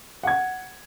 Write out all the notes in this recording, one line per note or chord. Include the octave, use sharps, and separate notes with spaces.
F#5 G#6